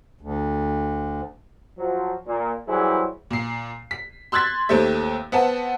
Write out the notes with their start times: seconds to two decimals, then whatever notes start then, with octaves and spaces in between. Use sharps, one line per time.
0.21 D2
1.78 F3 F#3
2.27 A#2
2.68 E3 F#3 G3 E4 G#4 C5
3.31 A#2 C7
3.91 B6
4.32 C6 E6 F#6 G#6 A6 B6
4.69 D#2 A3 C4 G4 E5
5.32 B3 C4 F#5 A5